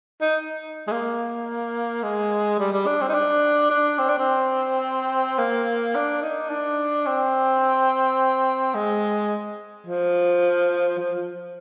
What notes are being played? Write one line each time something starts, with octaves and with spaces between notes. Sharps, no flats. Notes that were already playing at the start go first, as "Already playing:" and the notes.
D#4
G#3
A#3
G#3
G3
G3
D4
C4
D#4
D4
D4
C4
D4
C4
A#3
D4
D#4
D4
C4
G#3
F3
F3